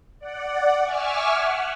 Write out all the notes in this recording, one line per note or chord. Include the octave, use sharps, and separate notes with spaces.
D5 F#5
E5 G#5 C#6 D6 E6 F6
F#5